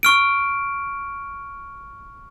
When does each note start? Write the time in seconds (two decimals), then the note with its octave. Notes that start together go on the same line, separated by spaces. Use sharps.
0.03 C#6 F6 D7